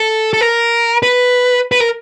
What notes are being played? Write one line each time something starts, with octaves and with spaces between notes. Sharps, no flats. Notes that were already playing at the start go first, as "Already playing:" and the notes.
Already playing: A4
A4
A#4
B4
B4
A#4